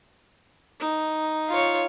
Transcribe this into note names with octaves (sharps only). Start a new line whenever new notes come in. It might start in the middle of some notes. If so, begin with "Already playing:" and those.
D#4
F4 C#5